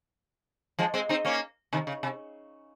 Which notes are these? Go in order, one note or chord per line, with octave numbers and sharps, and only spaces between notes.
F3 G#3
G#3 C4
C4 D#4
A#3 C#4
C3 D#3
C#3
C3